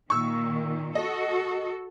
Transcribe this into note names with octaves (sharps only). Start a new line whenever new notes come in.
A#2 D#3 C#6 E6
F#4 A4 D#5